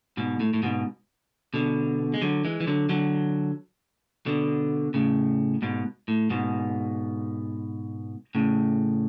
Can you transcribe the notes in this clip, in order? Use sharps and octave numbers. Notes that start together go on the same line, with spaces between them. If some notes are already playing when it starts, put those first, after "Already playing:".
G#2 B2
A2
A2
G#2 B2
B2 D3
G#3
D3 F#3
E3 G#3
E3
D3 F#3
D3 F#3
B2 D3
A2 C#3
G#2 B2
A2
G#2 B2
A2 C#3